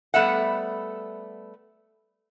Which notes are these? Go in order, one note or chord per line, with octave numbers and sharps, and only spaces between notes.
G3 A3 B3 E5 F#5